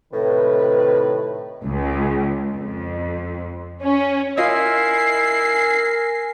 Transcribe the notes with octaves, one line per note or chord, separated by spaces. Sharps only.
A2 C3 D#3 B4
C#2
F2
C#4
E4 F4 A#4 D#5 G#5 C7